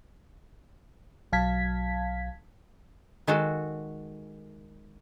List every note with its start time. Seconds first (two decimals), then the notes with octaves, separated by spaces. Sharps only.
1.32 B1 F#3 F5 A5 G#6 B6
3.27 D#3 G#3 F#4 A4